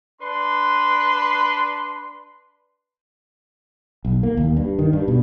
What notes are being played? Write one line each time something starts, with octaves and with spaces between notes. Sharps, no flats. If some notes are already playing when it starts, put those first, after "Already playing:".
D4 B4 C6
B1
A#3
D#2
G2
D#3
G2
B2